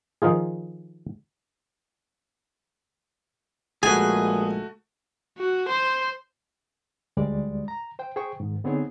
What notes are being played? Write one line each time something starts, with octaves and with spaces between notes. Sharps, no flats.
D#3 F3 D#4 F4 G#4
A#1 G#3 A3 F#4 G#4 B4 G#5
F#4
C5
D2 G3 G#3 D5
A#5
C5 G5
G#4 C5 G5 C#6
G#2 D#3
D3 B3 C4 D#4 G#4 C#5